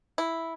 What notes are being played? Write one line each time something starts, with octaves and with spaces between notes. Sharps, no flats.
E4